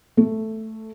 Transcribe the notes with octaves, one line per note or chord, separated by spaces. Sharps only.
A3